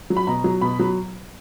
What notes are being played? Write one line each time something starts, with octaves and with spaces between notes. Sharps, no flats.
F#3
B5
B2 A#5
F#3
B2 B5
F#3